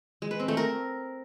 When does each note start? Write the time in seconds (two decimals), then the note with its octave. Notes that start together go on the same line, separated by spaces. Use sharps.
0.22 G#3
0.31 B4
0.40 C4
0.48 A3
0.57 A#4